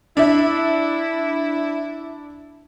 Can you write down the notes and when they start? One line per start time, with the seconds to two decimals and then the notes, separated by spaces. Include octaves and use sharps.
0.17 D4 E4 E5